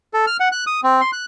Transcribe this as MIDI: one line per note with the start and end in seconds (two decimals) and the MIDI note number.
0.14 0.26 69
0.27 0.37 89
0.40 0.49 78
0.52 0.64 90
0.67 0.80 87
0.83 1.01 60
1.01 1.11 84
1.13 1.25 90